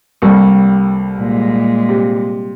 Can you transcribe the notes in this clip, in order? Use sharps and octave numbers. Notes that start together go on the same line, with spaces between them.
C2 G3 A#3 A4 C#6
A#2 G#3
C3